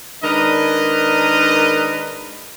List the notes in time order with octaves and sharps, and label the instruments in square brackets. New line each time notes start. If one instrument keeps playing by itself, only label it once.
[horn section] D#3 G#3 D4 A#4 B4 D#5